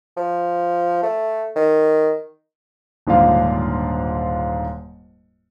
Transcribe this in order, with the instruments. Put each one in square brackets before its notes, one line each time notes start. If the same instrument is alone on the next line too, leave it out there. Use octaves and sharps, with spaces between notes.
[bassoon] F3
A3
D#3
[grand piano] D#1 G#2 D3 D4 F4 F5